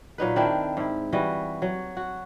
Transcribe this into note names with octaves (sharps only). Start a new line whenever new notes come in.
A#2 F#3 D#4 B4
D#3 C4 D4 E4
G#2 E4
E3 G3 F#4 D#5
F#3
F#4